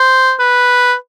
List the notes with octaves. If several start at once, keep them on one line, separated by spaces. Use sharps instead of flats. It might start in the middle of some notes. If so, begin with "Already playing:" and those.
Already playing: C5
B4